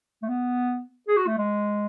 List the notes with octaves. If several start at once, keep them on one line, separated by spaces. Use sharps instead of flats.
A3
B3
G#4
F#4
A3
G#3